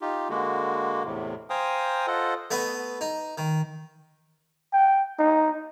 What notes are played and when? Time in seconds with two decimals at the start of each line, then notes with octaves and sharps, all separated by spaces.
0.02 D#4 F4 G4
0.30 D3 G#3 A#3 F#4
1.05 E2 A2 C3
1.50 C5 F5 G5 G#5 A#5 D#6
2.07 F4 A4 C5 D#5 F#5
2.51 A3 B3 D#5
3.01 D#4
3.38 D#3
4.73 G5
5.19 D#4